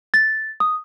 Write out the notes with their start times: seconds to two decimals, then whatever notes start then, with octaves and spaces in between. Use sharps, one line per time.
0.14 A6
0.60 D#6